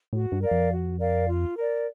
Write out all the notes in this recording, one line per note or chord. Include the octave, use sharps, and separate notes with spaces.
A2 F#4
G2
A#4 D5 F5
F2
F#4
A#4 D5 F5
F4
A#4 D5